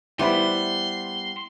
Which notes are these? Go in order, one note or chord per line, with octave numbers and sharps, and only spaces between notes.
G3 B3 E4 B4 C5 B5 C6